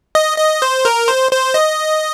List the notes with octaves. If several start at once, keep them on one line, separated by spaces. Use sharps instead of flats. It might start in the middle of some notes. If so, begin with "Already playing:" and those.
D#5
D#5
C5
A#4
C5
C5
D#5